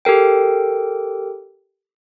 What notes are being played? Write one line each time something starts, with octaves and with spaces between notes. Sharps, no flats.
G4 A4 A#4 G5